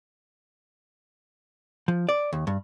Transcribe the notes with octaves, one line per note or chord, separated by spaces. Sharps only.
F3
D5
D#2
G2